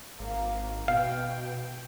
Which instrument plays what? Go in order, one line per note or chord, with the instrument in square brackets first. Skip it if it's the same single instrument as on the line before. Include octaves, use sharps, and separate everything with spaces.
[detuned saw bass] G#1 [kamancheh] A#3 F5
[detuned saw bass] B2 [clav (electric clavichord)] F5 [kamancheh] G5